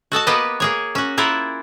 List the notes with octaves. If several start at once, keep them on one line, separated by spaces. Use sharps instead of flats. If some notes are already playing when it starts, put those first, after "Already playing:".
F#4 A4 D#5 A5
A#3 B3 G4 B4 D#5 F#5
A#3 G#4 C#5
C#4 F#4
A#3 E4 F4 A#4 F#5